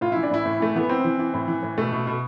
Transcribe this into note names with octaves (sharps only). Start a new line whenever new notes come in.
A2 F4
E3 E4
D4
A2 E4
A2
E3 A3
E3 B3
E3 C4
E3
E3
A2
E3
A2
B2 A3
B2
B2